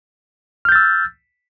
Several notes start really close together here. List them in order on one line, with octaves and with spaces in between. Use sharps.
F6 G6 A6 E6